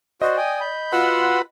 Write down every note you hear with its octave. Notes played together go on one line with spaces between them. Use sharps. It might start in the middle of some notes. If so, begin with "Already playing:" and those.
F#4 C5 D5 D#5
G5 G#5 D#6
B5 G6
F4 F#4 B4 F#5 C6 E6